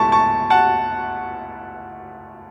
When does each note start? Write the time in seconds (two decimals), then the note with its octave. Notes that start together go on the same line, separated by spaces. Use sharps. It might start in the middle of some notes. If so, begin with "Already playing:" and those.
Already playing: C#2 B2 A3 E4 A5 C#6
0.12 A5 C#6
0.50 F#5 A5